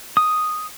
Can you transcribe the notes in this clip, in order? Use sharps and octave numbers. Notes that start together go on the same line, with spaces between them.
D#6